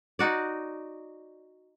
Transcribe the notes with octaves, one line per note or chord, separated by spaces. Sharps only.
D#4 F#4 D5